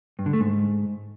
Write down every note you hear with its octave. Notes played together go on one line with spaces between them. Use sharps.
G2
D3
A3
G#2